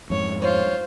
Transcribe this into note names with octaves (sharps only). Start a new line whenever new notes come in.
F2 G#2 C#5
F4 C5 C#5